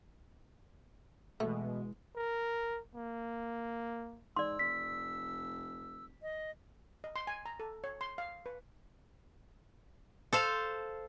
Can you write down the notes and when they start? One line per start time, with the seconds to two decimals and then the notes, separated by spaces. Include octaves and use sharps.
1.40 B2 E3 G#3 A3
2.16 A#4
2.95 A#3
4.36 G#2 D5 C6 E6
4.59 F1 B6
6.22 D#5
7.04 D#5
7.16 C6
7.27 G#5
7.46 A#5
7.60 A4
7.84 C#5
8.01 C6
8.18 F5
8.46 B4
10.33 A4 C5 F5